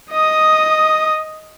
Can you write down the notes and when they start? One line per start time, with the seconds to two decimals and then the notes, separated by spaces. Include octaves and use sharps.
0.12 D#5 D#6